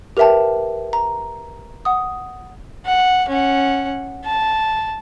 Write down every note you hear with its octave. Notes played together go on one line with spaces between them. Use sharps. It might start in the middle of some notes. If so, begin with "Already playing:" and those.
G4 A#4 B4 E5 G5 A5
A#5
F#5 D#6
F#5
C#4 F#5
A5